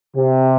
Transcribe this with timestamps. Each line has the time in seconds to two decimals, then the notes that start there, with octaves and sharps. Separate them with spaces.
0.17 C3